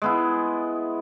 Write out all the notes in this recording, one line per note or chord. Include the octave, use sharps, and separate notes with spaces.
G#3 B3 E4